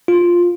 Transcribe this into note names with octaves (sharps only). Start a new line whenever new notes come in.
F4